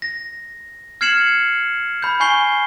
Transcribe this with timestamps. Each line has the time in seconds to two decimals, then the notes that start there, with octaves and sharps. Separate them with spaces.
0.02 A#6
1.01 F6 G#6 C7 C#7 E7 F#7
2.02 B5 G6
2.20 G#5 C#6 G6 C7 G7